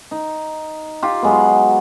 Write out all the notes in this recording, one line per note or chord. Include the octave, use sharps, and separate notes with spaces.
D#4
F4 G4
F#3 G#3 B3